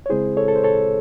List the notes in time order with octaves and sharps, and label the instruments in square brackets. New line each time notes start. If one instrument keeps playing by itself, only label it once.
[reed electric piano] C#5
C#3 G#3 C4 E4 G#4 C5
A4 C#5
A4
C5
A4 C#5